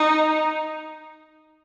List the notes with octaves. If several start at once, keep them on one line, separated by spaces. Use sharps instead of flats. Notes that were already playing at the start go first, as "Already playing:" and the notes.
Already playing: D#4